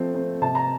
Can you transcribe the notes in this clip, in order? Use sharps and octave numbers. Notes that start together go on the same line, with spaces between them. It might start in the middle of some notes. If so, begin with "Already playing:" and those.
Already playing: F3 A3 C4
C4
C3 A5
A#5